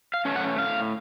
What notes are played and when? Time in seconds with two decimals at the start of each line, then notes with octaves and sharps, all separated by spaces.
0.14 F5
0.25 A3 C#4
0.36 F#5
0.58 A2 F5